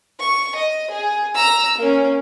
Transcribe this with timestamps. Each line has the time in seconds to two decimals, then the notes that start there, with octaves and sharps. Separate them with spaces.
0.20 C#6
0.55 D#5
0.90 G#4
1.35 A#5 E6
1.78 A#3 C#4